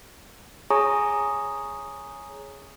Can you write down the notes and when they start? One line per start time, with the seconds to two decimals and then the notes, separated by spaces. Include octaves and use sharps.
0.70 G#4 C#5 G#5 A#5 C#6 D#6